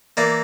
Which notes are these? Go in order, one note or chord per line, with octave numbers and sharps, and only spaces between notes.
E3 A#3 D5